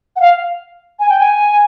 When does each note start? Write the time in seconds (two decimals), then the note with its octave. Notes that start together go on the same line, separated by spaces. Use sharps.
0.16 F#5
0.20 F5
1.00 G#5
1.09 G5
1.19 G#5